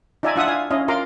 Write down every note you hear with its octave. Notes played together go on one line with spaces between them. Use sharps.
D#4 F4 D5 E5 G#5 A#5
D4 E4 F4 E5 F#5 D#6
F5 G#5
C#4 E4 D#5 F5
F4 A#4 F5 A#5 C6 D6